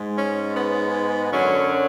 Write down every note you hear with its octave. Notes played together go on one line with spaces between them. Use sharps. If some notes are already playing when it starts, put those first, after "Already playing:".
Already playing: G#2 G#3
C#4
B3
F#2 D3 F#3 C#4